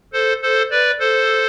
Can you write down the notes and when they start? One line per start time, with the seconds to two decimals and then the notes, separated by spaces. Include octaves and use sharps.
0.13 A4 C5
0.42 A4 C5
0.71 B4 D5
0.99 A4 C5